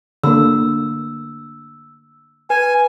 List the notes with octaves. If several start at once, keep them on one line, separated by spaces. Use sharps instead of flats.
D3 A#3 E6
B4 G#5